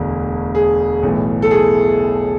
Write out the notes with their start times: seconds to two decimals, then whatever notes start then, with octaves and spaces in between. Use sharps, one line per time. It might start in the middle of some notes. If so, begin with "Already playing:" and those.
Already playing: E1 D2 D3
0.55 G#4
1.03 B1 A2 E3
1.42 A4
1.51 G#4